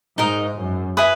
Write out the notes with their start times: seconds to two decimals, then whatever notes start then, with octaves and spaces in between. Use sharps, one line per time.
0.18 G#2 D#4 A#4 D#5
0.58 F#2
0.97 B4 E5 G#5 D#6